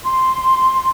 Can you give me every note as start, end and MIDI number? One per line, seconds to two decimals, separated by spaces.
0.03 0.90 84